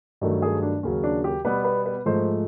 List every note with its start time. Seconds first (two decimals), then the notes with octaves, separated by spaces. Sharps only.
0.21 G2 D#3 F#3 A3
0.42 G#4
0.62 D4
0.83 D#2 C#3 F#3 C#4
1.04 D4
1.24 G4
1.44 B2 G3 B3 B4
1.64 B4
1.86 B4
2.06 G#2 F3 A3 C5